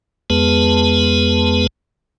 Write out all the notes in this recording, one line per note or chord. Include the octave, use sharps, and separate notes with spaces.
F2 G#3 B3 G#4 B4 A5